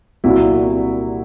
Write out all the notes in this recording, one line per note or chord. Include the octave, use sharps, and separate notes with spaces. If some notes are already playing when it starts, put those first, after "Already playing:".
C2 A#2 F#3 E4 F#4